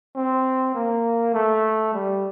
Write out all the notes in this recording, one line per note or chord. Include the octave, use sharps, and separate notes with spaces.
C4
A#3
A3
G3